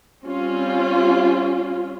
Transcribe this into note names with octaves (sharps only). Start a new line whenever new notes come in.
G3 C4 C#4 F4